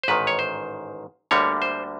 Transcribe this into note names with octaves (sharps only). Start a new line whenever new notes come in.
C5
A1 G#2 D#3 B4
C#5
C5
D2 D3 G3 A#3 C#5
C5